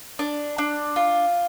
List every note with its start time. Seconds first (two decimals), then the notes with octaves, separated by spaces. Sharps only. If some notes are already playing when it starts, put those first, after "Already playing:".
0.19 D4
0.58 D4
0.96 F4